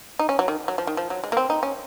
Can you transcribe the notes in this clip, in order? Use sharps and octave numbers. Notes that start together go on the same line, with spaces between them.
D#4
C#4
F#3
D#3
F#3
F3
D#3
F3
F#3
G#3
A#3
C4
D#4
C#4